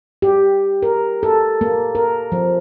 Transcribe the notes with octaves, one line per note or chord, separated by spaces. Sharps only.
G4
A#4
A4
A#3
A#4
F3